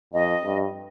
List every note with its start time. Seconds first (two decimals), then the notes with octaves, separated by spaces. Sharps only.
0.14 F2 D#5
0.44 G2